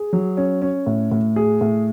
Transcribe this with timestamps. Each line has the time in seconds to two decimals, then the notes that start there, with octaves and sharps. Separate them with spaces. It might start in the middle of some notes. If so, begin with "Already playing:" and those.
Already playing: G#4
0.13 F#3
0.37 C#4
0.62 C#4
0.86 A2
1.11 A2
1.36 G#4
1.61 A2